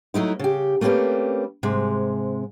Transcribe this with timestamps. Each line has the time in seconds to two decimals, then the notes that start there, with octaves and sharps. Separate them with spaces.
0.14 F#3 A3 D#4 E4
0.39 C#3 G4
0.81 A3 A#3 C4 C#4 G4 B4
1.63 G#2 C3 G#3